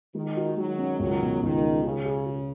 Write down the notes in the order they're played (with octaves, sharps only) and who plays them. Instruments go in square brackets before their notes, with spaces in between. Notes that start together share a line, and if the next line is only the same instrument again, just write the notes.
[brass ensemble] D#3 [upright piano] G#3
[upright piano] F#4
[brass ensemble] D#3 F#3 [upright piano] G#3
[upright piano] C#4
[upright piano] C#2 [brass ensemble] D#3 F#3
[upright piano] B2
[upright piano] C#2 [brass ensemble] D#3
[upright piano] G#3
[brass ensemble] C#3 [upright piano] G#4
[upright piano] G#4
G#4